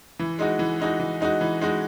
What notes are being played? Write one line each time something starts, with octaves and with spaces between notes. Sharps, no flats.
E3
G#3 D#4 F#4
E3
G#3 D#4 F#4
E3
G#3 D#4 F#4
E3
G#3 D#4 F#4